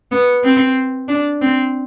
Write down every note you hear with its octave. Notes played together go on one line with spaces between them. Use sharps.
B3
C4
D4
C4